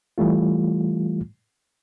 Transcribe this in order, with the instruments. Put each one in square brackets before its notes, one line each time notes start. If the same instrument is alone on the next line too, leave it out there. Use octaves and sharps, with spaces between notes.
[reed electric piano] E3 G3 A3 F4